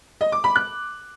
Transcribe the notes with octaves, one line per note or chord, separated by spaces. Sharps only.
D#5
D6
B5
F#6